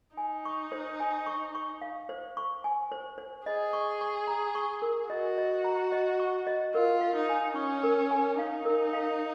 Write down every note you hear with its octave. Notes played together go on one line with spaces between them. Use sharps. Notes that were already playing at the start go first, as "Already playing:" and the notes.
D#4 G#5
C#6
C5
G#5
C#6
C#6
F5
C5
C#6
G#5
C5
C5
G#4 D#5
C#6
C#6
A#5
C#6
A#4
F#4 D#5
D#5
A#5
D#5
C#6
D#5
F4 A#4
F5
D#4
G#5
C#4 C#6
A#4
G#5
D#4 F5
A#4
F5